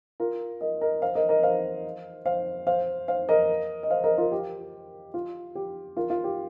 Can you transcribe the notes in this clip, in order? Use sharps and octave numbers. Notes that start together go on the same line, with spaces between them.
F4 A#4
A#4 D#5
A#4 D#5
C5 F5
A#4 D#5
A#4 D#5
C5 F5
C5 F5
C5 F5
C5 F5
A#4 D#5
D#5
C5 F5
A#4 D#5
F4 A#4
G4
F4
G4
F4 A#4
F4
G4